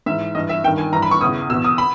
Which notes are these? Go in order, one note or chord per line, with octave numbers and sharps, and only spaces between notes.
G#2 E3 E5
G2 E3 D#5
E5
G2 D#3 G5
G#5
G2 E3 A#5
B5
C#6
E2 C#3 E3 D#6
B2 E6
E2
D#6
B5